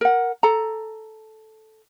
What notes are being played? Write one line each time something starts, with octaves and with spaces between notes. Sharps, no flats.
A#4 F#5
A4 A#5